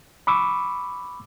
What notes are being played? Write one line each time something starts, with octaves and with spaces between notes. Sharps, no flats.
B5 C#6 D6 E6